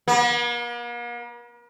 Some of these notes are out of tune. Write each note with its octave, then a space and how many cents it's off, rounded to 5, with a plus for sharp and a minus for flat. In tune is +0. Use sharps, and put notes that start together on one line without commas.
A#3 +45